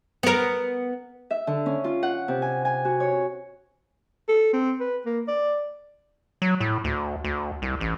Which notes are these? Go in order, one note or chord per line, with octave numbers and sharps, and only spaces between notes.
B3 A#4
E5
D3
C#4
F4
F#5
C3
G#5
G#5
F#4
C#5
A4
C4
B4
A#3
D5
F#3
A2
D2
D2
C2
A1